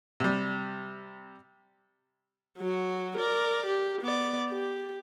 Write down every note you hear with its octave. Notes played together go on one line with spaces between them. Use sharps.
C3 G3
F#3 F#4
A#4 D5
G4
B3 D5
G4